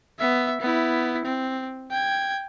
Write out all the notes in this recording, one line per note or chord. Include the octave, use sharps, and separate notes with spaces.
B3 E5
B3 E4
C4
G5 G#6